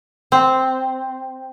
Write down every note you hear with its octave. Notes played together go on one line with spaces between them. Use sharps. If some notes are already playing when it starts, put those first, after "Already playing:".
C4